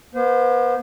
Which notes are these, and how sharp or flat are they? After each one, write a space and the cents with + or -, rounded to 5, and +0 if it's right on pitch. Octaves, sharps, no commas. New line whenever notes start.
B3 -40 C5 -30